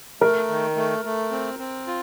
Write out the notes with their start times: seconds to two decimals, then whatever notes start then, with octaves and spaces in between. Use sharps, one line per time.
0.21 A3 A#4
0.49 D#3
0.76 A3
1.05 A3
1.32 C4
1.59 C4
1.87 F4